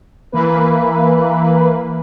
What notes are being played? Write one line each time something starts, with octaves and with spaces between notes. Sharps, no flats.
E3 A#3 B4